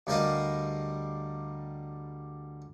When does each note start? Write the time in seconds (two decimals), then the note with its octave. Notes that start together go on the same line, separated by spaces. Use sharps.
0.07 D2 G3 A#4 D5 D#5 F5